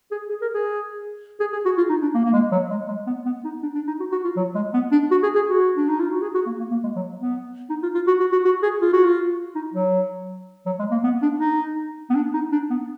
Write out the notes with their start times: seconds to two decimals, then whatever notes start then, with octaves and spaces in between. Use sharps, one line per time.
0.11 G#4
0.30 G#4
0.42 A#4
0.54 G#4
1.40 G#4
1.53 G#4
1.66 F#4
1.78 F4
1.90 D#4
2.02 D4
2.14 A#3
2.25 A#3
2.33 G#3
2.52 F#3
2.70 G#3
2.88 G#3
3.07 B3
3.26 B3
3.44 D#4
3.63 D4
3.75 D4
3.87 D#4
4.00 F#4
4.12 F#4
4.25 F4
4.37 F#3
4.55 G#3
4.74 B3
4.92 D4
5.11 F#4
5.23 G#4
5.35 G#4
5.48 F#4
5.77 D4
5.89 D#4
6.00 F4
6.11 F#4
6.22 G#4
6.35 F#4
6.47 A#3
6.60 A#3
6.71 A#3
6.84 G#3
6.96 F#3
7.21 B3
7.70 D#4
7.83 F4
7.95 F4
8.07 F#4
8.20 F#4
8.32 F#4
8.45 F#4
8.63 G#4
8.82 F4
8.93 F#4
9.05 F4
9.55 D#4
9.74 F#3
10.66 F#3
10.79 G#3
10.91 A#3
11.04 B3
11.22 D4
11.41 D#4
12.10 B3
12.15 D4
12.34 D#4
12.52 D4
12.70 B3